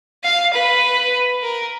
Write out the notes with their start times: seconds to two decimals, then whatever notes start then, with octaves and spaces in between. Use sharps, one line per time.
0.24 F5
0.53 B4
1.42 A#4